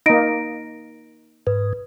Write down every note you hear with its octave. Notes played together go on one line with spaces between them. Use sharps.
A#3 D#4 A#6 D7
G#2 B4